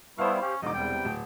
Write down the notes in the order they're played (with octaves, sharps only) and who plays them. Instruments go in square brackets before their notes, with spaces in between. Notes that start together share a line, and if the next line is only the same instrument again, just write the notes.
[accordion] G3 B3 E4 [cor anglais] A3 [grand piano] C5 F5
[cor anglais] C#4 [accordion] G4
[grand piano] E1 D6 [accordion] D3 F3 D#4 [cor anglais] D#5
[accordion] E2 C3 G3 [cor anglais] G5
[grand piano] D1